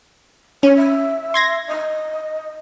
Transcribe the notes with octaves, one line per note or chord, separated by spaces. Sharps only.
C#4 C#5
E5
C6 G#6 A#6
D#5